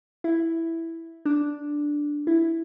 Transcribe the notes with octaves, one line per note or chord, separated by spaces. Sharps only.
E4
D4
E4